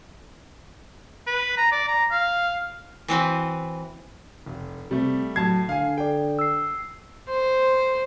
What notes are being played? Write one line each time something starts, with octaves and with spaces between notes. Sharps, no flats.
B4
A#5
D5
A#5
F5
E3 C4 F#4 B4
F1
C3 G3 A3
A2 F#3 A5 G#6 C7
D3 F5 G#5
A4 D5 G5
E6 C7
C5